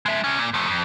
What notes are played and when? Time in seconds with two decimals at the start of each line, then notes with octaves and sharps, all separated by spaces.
0.06 G#3 E5
0.24 C3 C#4
0.39 A#2
0.54 F3 A3
0.69 F2